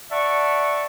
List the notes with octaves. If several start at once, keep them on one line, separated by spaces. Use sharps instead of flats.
D5 E5 F#5 A5 C#6